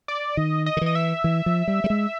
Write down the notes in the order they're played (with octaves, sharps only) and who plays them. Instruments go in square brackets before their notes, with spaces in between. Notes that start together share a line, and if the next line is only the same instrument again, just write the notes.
[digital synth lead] D5
[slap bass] D#3 [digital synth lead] D#5
[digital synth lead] D#5
[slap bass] D#3
[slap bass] E3 [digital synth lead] D#5
[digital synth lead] E5
[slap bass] E3
F3
G3
G3
G#3